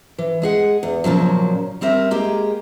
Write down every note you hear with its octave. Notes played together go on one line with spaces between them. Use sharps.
E3
G#3 G#4 F#5
E2
A#2 C#3 F3 F#3
G3 C4 A#4 E5
G#3 A#3 G4 G#4